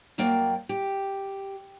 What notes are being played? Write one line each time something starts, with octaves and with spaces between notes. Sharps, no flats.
F#2 F#3 A#3 D5 G5
G4